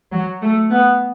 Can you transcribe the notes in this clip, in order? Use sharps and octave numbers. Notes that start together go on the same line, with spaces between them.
F#3
A3
B3